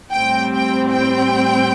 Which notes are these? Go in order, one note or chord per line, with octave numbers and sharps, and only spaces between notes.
A2 G3 C4 G5
G5
G5